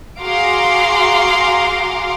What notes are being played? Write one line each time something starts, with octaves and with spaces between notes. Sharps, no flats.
F#4 G#4 F5 A#5 C6 D6